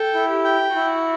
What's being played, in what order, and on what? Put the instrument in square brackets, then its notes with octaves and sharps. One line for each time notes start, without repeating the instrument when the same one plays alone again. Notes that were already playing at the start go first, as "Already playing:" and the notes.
Already playing: [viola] A4 [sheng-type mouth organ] G5
[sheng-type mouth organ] E4
[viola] G4
[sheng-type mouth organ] G5
[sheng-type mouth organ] E4 [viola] F#4